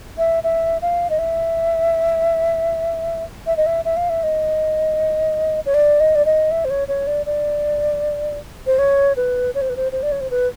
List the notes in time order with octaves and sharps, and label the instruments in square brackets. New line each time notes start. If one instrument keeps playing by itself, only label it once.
[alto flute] E5
E5
F5
D#5
E5
E5
D#5
E5
E5
F5
E5
D#5
C#5
D5
D#5
D5
D#5
E5
C5
C#5
C#5
D5
D5
C5
C#5
B4
C#5
C5
B4
C5
C5
D5
C#5
C5
B4